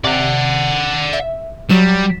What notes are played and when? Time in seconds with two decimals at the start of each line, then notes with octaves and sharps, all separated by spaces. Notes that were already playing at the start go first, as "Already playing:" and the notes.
0.04 C3 D5 F#5
1.13 E5
1.69 F#3 G3 E7